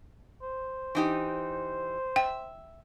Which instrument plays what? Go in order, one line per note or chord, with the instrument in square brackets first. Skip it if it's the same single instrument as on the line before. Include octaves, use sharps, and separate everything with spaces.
[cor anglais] C5
[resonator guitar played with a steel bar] E3 D#4 G4
[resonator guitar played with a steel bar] E5 [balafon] G5